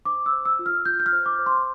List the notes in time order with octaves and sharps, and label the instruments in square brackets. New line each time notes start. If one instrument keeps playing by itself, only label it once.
[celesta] C5 D6
E6
C5
E6
F4
F6
F4 G6
G6
F6
C5
D6
C5
C6